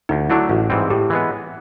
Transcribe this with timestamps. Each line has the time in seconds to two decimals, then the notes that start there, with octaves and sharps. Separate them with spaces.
0.09 D2 D#4
0.30 D3 F#3 A3 D4 E4
0.49 A1 F#4
0.70 G#2 E3 G3 C4
0.90 A2 G4
1.10 E3 G#3 B3